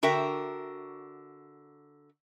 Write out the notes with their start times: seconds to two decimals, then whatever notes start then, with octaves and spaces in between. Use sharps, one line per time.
0.03 D3 F#4 A#4 E5 G5